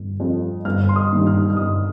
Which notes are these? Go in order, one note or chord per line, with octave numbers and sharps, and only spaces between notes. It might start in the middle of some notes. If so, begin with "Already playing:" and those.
Already playing: G1 F2
F2 F3
G1 F6
C6
D#6
G2 D#3 A#3 D#4
F6
F6
G1 D#6